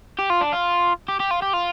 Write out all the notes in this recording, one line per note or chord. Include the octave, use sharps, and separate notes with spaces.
G4
F4
D4
F4
G4
G4
F4
G4
F4